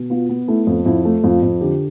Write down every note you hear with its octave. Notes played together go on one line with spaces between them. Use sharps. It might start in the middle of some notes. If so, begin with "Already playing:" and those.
Already playing: B2
B3 F4
B3
A3 E4
F2
F2 E4
A3
F2 F4
F2
D3 G4